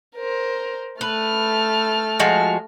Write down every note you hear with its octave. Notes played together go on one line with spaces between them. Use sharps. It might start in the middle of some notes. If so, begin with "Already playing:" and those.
A#4 C5
A3 B4 F6
F3 G#3 F#4